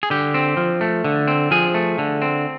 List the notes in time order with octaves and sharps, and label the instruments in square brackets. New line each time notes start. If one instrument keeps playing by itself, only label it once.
[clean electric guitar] G#4
D3 G4
C4
F3
A3
D3
C4
F3 G#4
A3
D3
C4